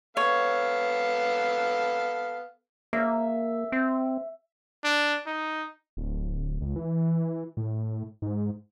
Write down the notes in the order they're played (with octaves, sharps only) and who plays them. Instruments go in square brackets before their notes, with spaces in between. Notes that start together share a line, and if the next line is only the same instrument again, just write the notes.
[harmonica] B3 A4 F5 [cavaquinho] C#5
[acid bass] A#3 [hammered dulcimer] E5
[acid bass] C4
[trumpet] D4
D#4
[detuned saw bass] D1
C#2
E3
A2
G#2